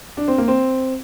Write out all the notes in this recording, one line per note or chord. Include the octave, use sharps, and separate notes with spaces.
D4
C4
A#3
C4